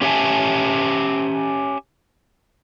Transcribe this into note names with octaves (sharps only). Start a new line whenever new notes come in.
C#4 G4 C#5 E5 G#5 A5